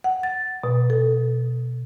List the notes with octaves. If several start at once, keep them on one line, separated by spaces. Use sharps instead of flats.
F#5
A6
B2
A4